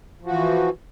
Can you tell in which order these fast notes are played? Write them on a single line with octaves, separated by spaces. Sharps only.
F3 F#4 E3